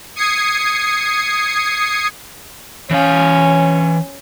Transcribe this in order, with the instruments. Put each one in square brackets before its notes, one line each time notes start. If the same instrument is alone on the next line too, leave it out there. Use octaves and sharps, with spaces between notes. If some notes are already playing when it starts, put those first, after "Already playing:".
[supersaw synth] D#6 G#6 C7 C#7
[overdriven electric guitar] E3 F5 [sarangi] C#4